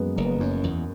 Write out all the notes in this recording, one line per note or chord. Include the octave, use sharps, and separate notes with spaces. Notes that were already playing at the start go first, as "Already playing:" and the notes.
Already playing: F#2 G#3 A#3 B3
F#1 A#3
B3
A#3
F#2 C#4
E2